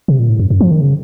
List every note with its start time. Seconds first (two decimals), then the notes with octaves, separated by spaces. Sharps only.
0.08 C3
0.19 A#2
0.29 A2
0.39 F#2
0.50 F#2
0.61 F3
0.71 D#3
0.81 C#3